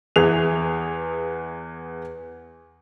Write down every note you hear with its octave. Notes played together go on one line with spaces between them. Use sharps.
E2 E3 G#4 F7